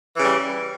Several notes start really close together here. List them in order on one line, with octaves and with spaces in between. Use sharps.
E3 C#3 G3